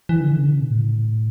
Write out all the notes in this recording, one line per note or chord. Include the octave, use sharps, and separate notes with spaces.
E3
D3
E3
C#3
D3
C#3
B2
A2